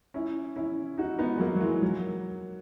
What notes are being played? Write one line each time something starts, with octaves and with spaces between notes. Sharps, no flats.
C#4 E4
C#4 E4
D#4 F#4
B3 D#4
G#3
F#3 A#3
F#3
E3 G#3
F#3 A#3